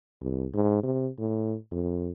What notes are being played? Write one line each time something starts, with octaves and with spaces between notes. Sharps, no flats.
C2
G#2
C3
A2
F2